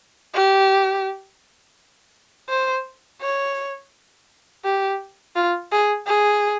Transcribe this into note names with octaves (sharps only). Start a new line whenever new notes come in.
G4
C5
C#5
G4
F4
G#4
G#4